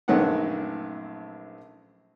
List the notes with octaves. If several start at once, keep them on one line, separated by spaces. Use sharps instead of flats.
A#1 F#2 D#3 A3 B3 F#5